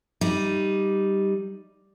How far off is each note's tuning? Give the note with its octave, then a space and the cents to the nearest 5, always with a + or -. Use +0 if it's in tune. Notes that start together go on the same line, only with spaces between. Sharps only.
G3 +0 D#4 +0